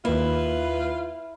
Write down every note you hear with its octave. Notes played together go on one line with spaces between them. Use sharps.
D#2 A#3 E4 F4 B4